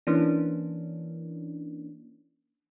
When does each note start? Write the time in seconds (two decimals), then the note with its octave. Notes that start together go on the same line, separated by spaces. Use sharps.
0.07 E3 A#3 C#4 D4